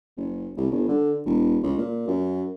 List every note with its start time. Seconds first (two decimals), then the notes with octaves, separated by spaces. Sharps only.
0.17 F#1
0.57 C2
0.71 G1
0.88 D3
1.25 E1
1.63 C#2
1.78 A#2
2.08 F#2